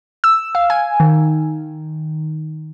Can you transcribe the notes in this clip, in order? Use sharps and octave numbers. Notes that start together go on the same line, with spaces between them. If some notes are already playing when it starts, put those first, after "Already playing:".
E6
F5
G#5
D#3